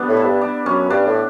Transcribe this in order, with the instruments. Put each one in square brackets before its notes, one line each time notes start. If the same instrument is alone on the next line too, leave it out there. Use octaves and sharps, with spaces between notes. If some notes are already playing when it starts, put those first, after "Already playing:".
Already playing: [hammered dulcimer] G3 B3 D4
[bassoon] A2
[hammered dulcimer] E4
[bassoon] G2
[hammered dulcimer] D4
[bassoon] F#2 [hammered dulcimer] C#4
[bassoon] G2 [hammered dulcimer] D4
[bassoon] A2